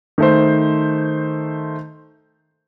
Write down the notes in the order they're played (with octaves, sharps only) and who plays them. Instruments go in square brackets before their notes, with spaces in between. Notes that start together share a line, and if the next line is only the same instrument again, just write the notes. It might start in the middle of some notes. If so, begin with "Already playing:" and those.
[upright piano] D#3 A3 C5